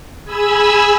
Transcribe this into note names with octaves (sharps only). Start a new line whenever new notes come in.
G#4 G#5 B5 E6